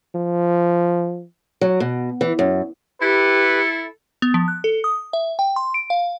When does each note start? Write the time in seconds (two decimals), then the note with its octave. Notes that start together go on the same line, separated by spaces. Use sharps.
0.15 F3
1.61 F#3
1.80 B2
2.21 E3
2.39 F#2
3.02 E4 G4 A4 B4
4.22 B3
4.34 F3
4.48 F#6
4.64 A4
4.84 D#6
5.13 E5
5.39 G5
5.56 C6
5.74 D7
5.90 F5